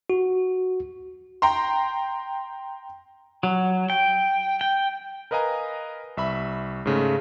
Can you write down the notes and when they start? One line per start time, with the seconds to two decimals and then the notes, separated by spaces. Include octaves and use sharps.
0.10 F#4
1.42 G5 A#5 C6
3.43 F#3
3.90 G5
4.61 G5
5.31 A#4 B4 D#5 F5 G#5 A#5
6.17 C2 E5 B5
6.85 G#2 C#3 A3